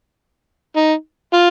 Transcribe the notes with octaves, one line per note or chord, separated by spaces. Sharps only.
D#4
F4